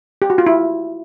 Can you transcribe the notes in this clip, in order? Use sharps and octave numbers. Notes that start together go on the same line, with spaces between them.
G4
F#4
F4
E4